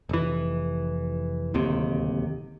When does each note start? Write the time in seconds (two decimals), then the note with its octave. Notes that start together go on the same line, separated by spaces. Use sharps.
0.09 F1 E3
1.54 D1 D#2 C3